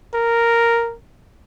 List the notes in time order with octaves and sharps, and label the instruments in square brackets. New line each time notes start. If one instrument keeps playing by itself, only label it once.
[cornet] A#4